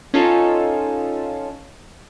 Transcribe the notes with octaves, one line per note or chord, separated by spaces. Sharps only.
C#4 D#4 F4 A4